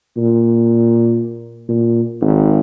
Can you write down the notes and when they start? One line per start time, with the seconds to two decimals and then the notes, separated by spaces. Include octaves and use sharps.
0.17 A#2
1.68 A#2
2.21 G#1